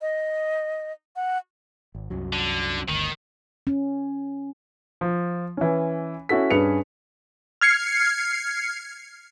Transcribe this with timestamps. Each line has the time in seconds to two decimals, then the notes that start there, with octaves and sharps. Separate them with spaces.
0.01 D#5
1.16 F#5
1.95 G#1
2.10 C2 F#2 F#3
2.33 D3
2.89 G1 D2 D#3
3.67 C#4
5.01 F3
5.57 E3 C#4
6.29 C#4 E4 F#4 A4 B6
6.50 G2 C#4 G#4 B4 C#7 F7
7.61 F6 G#6 C7 C#7